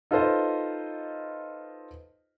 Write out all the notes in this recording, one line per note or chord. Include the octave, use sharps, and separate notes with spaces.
D#4 F4 A4 B4 C5 D#5